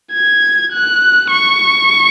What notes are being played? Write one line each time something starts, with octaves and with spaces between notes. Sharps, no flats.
G#6
F#6
C#6